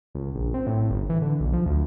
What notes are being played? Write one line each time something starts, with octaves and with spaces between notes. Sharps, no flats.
C#2
A#1
C4
A2
G1
E3
D3
B1
F3
D2